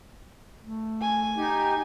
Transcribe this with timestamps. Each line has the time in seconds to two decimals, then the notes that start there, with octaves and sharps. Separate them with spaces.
0.61 A3
1.01 G#5
1.37 D#4 G4